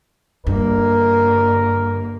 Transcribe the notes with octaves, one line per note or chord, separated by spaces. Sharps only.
G1 G2 A#3 A#4